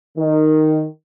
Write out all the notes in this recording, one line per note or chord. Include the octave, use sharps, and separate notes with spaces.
D#3